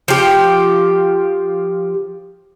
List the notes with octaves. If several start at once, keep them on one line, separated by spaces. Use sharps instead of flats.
F3 G4